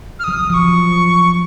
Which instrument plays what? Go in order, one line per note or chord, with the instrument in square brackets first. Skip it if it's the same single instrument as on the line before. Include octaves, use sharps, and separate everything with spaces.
[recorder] F6
[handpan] F#3 [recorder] D#6
[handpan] F3 [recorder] C#6 D#6